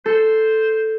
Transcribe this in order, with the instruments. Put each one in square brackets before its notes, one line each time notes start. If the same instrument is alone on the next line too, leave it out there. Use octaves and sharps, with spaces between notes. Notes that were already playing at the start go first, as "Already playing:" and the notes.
[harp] A4 [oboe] C5